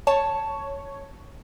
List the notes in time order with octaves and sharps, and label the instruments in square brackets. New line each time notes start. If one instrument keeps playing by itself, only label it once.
[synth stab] C#5 [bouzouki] A5